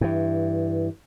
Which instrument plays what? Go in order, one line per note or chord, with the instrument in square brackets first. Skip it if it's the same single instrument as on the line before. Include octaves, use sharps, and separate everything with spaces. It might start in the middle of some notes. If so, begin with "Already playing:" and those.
[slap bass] G2 E3